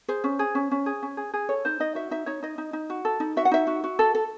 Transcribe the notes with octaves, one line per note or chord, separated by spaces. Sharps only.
G#4 C5
C#4
G#4
C#4
C#4
G#4
C#4
G#4
G#4
A4 C#5
D#4 C5
D#4 D#5
F#4 E5
D#4 E5
D#4 C#5
D#4 D#5
D#4
D#4
F#4
A4
D#4
F#4 E5
F#5
D#4 E5
F#4
F#4
A4
A4